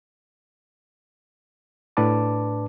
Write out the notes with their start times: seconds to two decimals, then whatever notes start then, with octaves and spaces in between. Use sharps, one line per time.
1.97 A2 D4 B4 D5 A5 D6